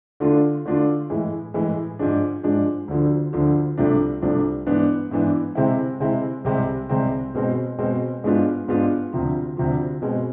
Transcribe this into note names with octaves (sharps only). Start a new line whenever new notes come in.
D3 A3 D4 F4
D3 A3 D4 F4
A2 E3 G#3
A2 E3 G#3
G#2 F3 G#3 D4
G#2 F3 G#3 D4
D2 D3 F3
D2 D3 F3
C2 C3 F3 A3 D4
C2 C3 F3 A3 D4
G#2 E3 B3 D4
G#2 E3 B3 D4
C3 G#3 C4 E4
C3 G#3 C4 E4
C2 C3 G#3 C4
C2 C3 G#3 C4
B2 G#3 C4
B2 G#3 C4
G#2 G#3 B3 D4 F4
G#2 G#3 B3 D4 F4
D2 C3 F3
D2 C3 F3
B2 G#3 C4